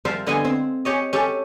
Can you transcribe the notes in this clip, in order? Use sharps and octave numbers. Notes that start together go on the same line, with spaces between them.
F3 G3 A#4 C5 E5 F5
D3 B3 D#5 F5 G#5
C4
C#4 G4 C#5 D#5
C#4 G4 A4